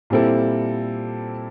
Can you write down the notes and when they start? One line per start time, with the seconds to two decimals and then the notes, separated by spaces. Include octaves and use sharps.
0.10 A#2 G3 C4 E4 A4